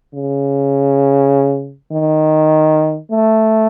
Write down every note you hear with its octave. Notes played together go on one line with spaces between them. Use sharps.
C#3
D#3
A3